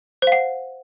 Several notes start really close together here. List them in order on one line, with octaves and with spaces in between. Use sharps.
C5 F5 F#5